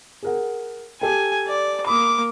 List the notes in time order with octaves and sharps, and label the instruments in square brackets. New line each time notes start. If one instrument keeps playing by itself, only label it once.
[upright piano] G#4 A#4 F#5
[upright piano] G4 A4 G5 [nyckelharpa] G#5
[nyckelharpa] D5
[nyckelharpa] A#3 D6 [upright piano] B5 D#6